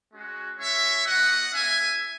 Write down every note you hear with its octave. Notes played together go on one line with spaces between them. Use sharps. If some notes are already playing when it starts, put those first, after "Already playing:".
G#3 C#4 F#4
G#3 C#4 E4 C#5 E5
B3 F#4 D#5 F#5
A#3 C#4 E4 E5 G#5